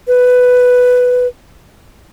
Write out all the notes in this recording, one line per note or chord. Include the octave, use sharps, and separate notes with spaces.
B4